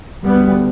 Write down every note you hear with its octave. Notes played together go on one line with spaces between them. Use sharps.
D2 G3 B3